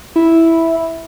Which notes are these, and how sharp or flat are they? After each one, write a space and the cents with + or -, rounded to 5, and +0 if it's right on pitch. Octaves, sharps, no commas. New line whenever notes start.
E4 -5